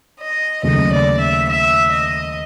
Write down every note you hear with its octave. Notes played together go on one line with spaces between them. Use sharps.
D#5
D#2 C#3 F#3 A3 D#5
D5
E5
E5
D#5